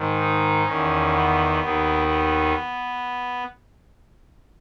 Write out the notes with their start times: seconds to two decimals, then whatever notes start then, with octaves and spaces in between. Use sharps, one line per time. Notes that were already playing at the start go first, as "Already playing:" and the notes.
Already playing: G#2 D#3
0.19 D#4
0.66 E2 D#3 C#4
1.13 B3
1.60 D#2 D#3
2.06 B3